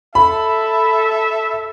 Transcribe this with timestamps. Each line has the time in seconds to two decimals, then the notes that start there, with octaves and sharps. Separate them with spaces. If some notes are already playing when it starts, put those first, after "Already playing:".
0.15 A4 E5 B5